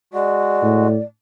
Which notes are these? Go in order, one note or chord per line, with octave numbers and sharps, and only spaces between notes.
G#3 F#4 D5
A2